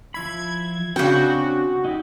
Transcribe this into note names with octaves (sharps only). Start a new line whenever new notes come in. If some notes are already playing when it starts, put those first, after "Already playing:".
F3 E4 B5 G#6
C#3 C4 D4 F#4 G5
D#4 E4 G4